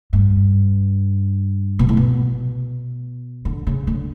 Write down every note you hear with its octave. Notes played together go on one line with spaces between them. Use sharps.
G2
B2
A2
B2
D3
C#3
D3